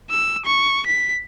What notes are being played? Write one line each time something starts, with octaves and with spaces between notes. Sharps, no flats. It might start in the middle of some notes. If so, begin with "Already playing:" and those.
E6
C#6
B6